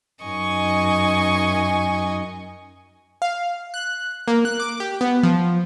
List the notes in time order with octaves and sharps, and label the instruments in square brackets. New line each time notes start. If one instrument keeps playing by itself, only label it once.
[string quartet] F#2 D#4 D#5 G#5 C#6
[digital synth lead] F5
F#6
A#3
F#6
D6
G4
B3
F3